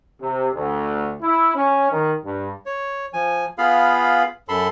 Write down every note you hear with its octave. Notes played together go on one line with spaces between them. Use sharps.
C3
D2
E4
C#4
D#3
G2
C#5
F3 G#5
B3 F4 G#4 F5 B5
F#2 A4 A5 B5 C6